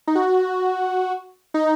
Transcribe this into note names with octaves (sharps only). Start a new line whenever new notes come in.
D#4
F#4
D#4